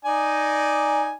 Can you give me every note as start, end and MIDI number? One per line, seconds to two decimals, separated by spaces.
0.05 1.13 63
0.05 1.13 74
0.05 1.13 80